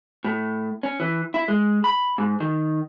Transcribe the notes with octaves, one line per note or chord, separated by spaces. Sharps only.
A2
C#4
E3
E4
G#3
B5
G#2
D#3